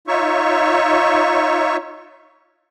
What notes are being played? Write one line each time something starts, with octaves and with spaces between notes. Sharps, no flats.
D#4 F4 C#5 E5 C#6